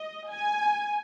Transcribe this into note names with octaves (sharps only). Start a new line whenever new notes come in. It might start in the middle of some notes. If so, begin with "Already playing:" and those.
Already playing: D#5
G#5